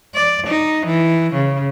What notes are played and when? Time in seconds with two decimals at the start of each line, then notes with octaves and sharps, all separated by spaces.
0.15 D5
0.47 D#4
0.86 E3
1.34 C#3